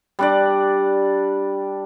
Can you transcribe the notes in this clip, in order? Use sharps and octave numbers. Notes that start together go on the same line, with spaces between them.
G3 D4 D5